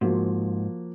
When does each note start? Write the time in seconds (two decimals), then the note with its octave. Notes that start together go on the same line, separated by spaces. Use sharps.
0.01 G#2 F3 A#3 F#4